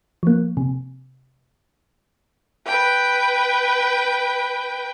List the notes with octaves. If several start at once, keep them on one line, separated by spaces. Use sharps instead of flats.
F3 A#3
C3
B4 G5